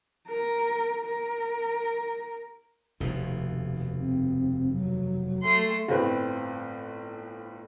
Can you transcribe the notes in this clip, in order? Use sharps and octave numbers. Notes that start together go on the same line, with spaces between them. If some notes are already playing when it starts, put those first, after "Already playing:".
A#4
A#4
F1 D#2 B2
C4
F#3
A3 C6
G1 A2 C4 B4